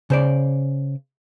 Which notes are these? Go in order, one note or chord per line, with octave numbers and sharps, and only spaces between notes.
C#3 C5 D5